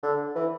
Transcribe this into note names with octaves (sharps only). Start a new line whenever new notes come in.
D3
E3